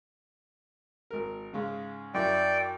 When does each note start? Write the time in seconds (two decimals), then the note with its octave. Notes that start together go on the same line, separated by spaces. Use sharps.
1.11 G#1 A#4
1.53 G#2 C#3 G#3
2.14 F#2 E4 D5 G5